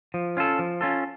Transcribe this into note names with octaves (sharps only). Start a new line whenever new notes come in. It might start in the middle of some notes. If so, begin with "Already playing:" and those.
F3
C#4 F4 A4
F3
C#4 F4 A4